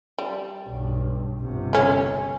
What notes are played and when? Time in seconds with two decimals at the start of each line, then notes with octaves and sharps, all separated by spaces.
0.18 G3
0.67 B1 G2
1.40 G1 C3
1.73 A3 C#4